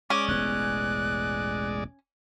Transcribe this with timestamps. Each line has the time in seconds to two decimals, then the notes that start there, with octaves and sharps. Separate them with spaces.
0.10 G#3 C#4 D5 D6
0.28 E1 A1 B3 F#6